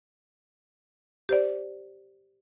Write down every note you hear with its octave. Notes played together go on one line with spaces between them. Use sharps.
G4 C5 D5